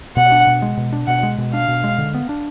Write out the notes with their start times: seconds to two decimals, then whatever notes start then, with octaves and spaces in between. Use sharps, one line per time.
0.17 B2 F#5
0.32 D4
0.47 B2
0.62 G#3
0.77 B2
0.93 D4
1.07 B2 F#5
1.23 G#3
1.38 B2
1.53 D4 F5
1.68 B2
1.84 G#3
1.98 D3
2.14 B3
2.29 D4